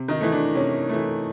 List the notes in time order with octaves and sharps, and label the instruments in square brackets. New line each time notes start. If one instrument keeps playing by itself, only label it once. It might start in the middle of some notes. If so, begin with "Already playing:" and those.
Already playing: [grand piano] C3
D#3 D#4
E3 A3
D4
C3 C#4
E3 A3